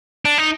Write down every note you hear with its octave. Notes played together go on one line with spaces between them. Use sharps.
D4
D#4